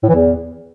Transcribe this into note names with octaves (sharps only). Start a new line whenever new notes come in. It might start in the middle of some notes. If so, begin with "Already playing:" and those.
A2
E3
E2